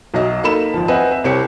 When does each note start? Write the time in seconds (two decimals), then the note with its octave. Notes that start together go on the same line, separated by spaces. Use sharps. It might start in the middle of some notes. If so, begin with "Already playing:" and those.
0.14 B1 F#3 D#5 E5
0.43 A#3 D#4 A4 B5 E7
0.74 G#1 F3
0.88 C4 B4 D#5 E5 F#5 G#5
1.11 E5
1.24 C2 C4 G4 C#5 C#7